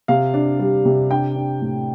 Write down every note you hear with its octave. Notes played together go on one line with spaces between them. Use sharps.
C3 F5
D4
G3
C3
D4 G5
D4
A2